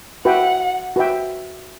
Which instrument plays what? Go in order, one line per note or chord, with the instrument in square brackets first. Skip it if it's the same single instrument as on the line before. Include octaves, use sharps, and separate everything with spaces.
[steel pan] F#4 B4 E5 G5 [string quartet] F#5
[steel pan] F#4 B4 E5 G5